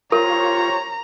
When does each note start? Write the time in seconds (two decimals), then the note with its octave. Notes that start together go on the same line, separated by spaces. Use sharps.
0.12 F4 G4 A#4 C5 C#5 A#5